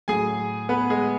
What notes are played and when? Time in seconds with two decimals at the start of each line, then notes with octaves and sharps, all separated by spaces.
0.08 A2 F#3 G#4 G#5
0.69 B3 B4
0.90 G#3 G#4